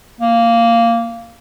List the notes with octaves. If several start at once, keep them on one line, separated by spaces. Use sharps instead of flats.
A#3